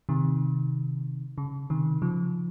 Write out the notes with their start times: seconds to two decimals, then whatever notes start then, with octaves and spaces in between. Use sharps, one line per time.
0.09 C3 D#3
1.38 C#3
1.70 C3 D#3
2.02 C#3 F3